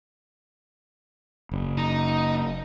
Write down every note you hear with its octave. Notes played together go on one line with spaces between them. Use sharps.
F#1
D#4